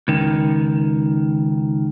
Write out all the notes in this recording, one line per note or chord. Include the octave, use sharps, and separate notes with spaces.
C#2 D#3